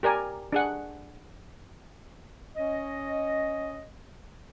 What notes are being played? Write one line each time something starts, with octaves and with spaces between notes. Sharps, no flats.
G4 A#4 D5 G#5
D4 G#4 F#5
C#4 C#5 D#5